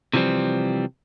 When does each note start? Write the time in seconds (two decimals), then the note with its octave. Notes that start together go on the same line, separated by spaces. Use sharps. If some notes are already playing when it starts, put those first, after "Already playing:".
0.14 C3 E3 F3 G3 C4